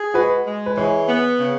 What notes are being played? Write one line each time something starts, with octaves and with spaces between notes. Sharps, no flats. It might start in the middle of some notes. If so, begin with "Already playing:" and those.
Already playing: G#4
G#3 F#4 B4
G#3
B4
E3 G#4 C#5
B3
C#3